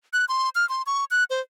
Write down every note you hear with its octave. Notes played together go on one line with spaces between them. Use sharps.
F#6
C6
F6
C6
C#6
F#6
C5